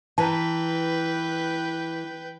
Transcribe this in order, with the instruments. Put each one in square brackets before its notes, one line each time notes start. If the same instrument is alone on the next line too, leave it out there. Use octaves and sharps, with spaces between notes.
[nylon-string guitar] E3 [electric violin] B4 G5 [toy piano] A5 A#5